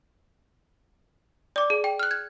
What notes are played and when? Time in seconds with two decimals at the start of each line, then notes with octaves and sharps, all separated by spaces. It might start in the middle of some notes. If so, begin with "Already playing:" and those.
1.56 D5 D6
1.70 G#4
1.84 G5
1.99 F6 F#6
2.11 G#6